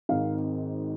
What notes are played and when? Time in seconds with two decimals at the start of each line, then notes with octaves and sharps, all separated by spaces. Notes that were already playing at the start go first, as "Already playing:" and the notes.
0.09 G#1 G#2 D#3 C4 F5